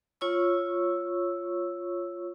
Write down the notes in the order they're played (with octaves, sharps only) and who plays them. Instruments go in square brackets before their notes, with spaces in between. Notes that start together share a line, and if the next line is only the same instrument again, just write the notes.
[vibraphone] F4 C#5 C#6 E6